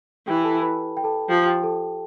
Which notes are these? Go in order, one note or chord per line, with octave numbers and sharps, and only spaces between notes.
E3 G4 G5
A4 A5
B4 B5
G5
A4 A5
F3 G4 G5
G4 G5
A4 A5